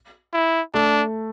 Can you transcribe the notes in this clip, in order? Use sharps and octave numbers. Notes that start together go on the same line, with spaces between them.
E4
A3 D4